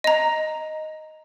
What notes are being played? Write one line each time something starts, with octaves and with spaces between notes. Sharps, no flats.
D#5 A#5